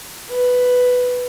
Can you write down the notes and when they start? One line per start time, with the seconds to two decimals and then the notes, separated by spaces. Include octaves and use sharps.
0.29 B4